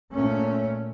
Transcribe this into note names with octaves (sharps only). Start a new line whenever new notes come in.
A#2 A3 C#4